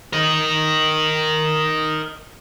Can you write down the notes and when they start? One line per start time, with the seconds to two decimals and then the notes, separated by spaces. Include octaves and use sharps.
0.13 A#4 D#5